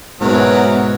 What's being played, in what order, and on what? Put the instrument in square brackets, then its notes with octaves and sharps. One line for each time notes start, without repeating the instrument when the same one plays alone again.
[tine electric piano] G#2 B2 [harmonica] E3 F#3 A#4 [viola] B3